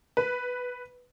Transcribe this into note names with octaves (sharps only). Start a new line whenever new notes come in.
B4